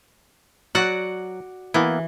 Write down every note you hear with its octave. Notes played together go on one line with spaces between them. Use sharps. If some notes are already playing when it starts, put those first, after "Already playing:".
F#3 F#4 D5 F#5
E3 A#3 B3 E4